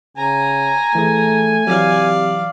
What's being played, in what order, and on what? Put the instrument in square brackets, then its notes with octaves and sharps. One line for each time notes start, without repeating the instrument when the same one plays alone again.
[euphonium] C#3 [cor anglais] G#5 [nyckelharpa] A#5
[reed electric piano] E3 G#4 [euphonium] A3
[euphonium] C3 [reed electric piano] E3 F#3 [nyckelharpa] D5 F5